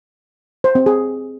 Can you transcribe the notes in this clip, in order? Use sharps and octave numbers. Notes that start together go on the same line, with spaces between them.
C5
C4
G#4